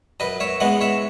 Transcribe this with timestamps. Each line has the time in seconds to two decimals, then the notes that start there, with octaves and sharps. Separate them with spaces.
0.20 F#2 B4 D#5
0.40 C#5 E5
0.60 E3 G#3 B3 D#5 F#5
0.81 C#5 E5